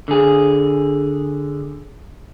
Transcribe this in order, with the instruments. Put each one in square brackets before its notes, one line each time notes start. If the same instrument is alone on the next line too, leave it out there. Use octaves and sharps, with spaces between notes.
[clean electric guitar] D3 G#4